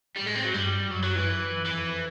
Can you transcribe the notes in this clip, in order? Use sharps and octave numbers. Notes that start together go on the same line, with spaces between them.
A2 G3
G#3
C4
F#3
G2 G3
F#2 F#3
F#3
E3
F#2
F2 E3